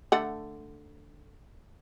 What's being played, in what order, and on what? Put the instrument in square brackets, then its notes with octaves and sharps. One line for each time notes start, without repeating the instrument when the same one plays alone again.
[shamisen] D3 A3 F#5